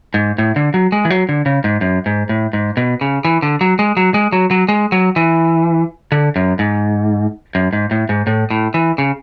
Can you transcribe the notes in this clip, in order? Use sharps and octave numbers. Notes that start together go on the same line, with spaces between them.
G#2
A2
D3
F#3
G#3
E3
F#3
D3
C#3
G#2
F#2
G#2
A2
G#2
B2
C#3
E3
D3
F#3
G#3
F#3
G#3
F#3
F#3
G#3
F#3
E3
D3
F#2
G#2
F#2
G#2
A2
G#2
A2
A2
E3
C#3